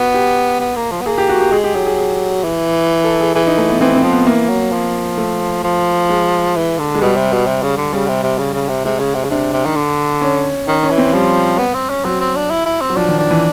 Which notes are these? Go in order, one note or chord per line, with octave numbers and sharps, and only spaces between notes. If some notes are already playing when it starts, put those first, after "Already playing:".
Already playing: B3 F#4
G4
B3
A#3
F3
B3
A#3 G#4
G4
F#4
G4
G#3 G#4
G4
F#3 G#4
G#4
G#4
E3
A4
G#4
E3 G#4
D#4
A3
B3
E3 C4
C4
F3
B3
E3 A#3
F#3
F3
A3
F3
G#3
E3
D3
G#3
B2 G3
C3
B2
C3
C#3
D3
C#3 G3
C3
C3
C#3
C#3
C3
C3 G#3
C#3
C3
C#3
C3 D4
C3
D#3
D3
C#4
D#3 C#4
C#4
E3
C4
F3 G3
B3
C4
C#4
F#3 C4
C4
D4
E4
E4
C4
F#3
F3 D4
D#3
D4
E3